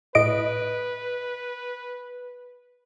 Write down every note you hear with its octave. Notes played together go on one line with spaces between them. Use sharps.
A2 B4 D#5 D7